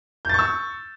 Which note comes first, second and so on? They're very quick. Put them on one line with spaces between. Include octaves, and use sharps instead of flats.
G6 A6 C#6 E6